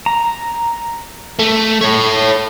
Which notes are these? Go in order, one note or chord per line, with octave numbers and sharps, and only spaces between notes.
A#5
A3
A4 C#5